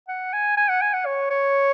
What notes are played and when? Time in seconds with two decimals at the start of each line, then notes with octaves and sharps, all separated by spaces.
0.08 F#5
0.33 G#5
0.57 G#5
0.69 F#5
0.82 G#5
0.93 F#5
1.06 C#5
1.30 C#5